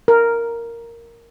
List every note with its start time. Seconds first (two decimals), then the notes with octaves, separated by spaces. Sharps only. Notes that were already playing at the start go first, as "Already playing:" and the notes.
0.08 A#4